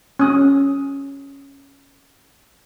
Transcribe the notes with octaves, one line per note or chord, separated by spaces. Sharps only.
C#4 D#6